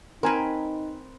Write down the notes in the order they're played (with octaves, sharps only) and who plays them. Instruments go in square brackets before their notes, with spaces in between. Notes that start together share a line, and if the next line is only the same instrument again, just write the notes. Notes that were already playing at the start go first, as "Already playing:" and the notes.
[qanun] C4 B4 [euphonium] D#4 [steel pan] A#4 G#5